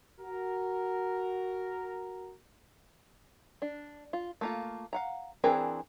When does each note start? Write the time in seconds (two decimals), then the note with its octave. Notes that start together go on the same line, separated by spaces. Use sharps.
0.21 F#4 A#4
3.62 D4
4.13 F4
4.41 A3 A#3 F4
4.93 F5 F#5 A#5
5.44 E3 C4 D4 G#4 A#4